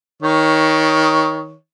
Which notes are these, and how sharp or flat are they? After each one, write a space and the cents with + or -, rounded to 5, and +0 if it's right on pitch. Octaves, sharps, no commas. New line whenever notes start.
D#3 +20 C#5 +0